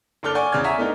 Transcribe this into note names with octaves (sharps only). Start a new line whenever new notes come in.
F#1 D4 A4 D6 F6 G7
D5 F#5 G#5 C#6 D6
E2 C#3 D5 F6 G#6
E5 F#5 G#5 A#5 C#6
A3 B3 D4 D#4 A#4